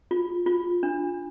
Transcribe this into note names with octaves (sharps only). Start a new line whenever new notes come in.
F4
F4
D4